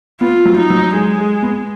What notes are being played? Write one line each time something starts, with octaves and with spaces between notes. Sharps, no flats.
B3 F4
F#3
D#4
F#3
G#3 G#4
G#4
B3